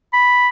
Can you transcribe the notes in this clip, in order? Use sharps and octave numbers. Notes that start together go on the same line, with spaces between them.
B5